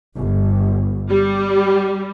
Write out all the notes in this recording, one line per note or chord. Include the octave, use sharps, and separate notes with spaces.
G1
G3